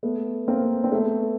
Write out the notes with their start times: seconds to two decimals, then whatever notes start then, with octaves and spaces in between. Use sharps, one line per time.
0.03 A3 B3
0.48 A#3 C4
0.84 C4
0.92 A3 B3